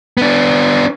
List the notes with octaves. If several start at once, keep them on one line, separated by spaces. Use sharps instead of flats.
B3 D4